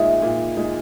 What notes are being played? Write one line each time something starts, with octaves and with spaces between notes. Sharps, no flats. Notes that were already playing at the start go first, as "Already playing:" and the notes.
Already playing: A#2 G#3 D#4 E5
A#2
G#3 D#4